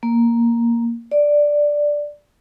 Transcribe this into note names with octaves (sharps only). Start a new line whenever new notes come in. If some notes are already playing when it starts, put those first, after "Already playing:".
A#3
D5